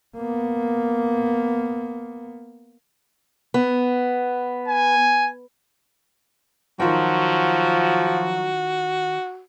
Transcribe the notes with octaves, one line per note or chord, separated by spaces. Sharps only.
A#3 B3
B3
G#5
D#3 F3 F#3 F4 F#4 G5